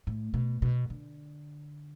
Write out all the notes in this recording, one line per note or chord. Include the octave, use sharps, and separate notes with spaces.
A2
B2
B2
D3